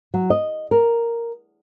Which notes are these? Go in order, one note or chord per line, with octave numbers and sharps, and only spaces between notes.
F#3
D#5
A#4